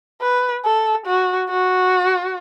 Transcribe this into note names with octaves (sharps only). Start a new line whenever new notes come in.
B4
A4
F#4
F#4